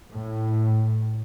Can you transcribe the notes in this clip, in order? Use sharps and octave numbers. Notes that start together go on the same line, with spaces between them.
A2